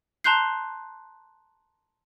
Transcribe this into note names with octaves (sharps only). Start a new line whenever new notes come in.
A5 A#5 C6 F#6 G6 C7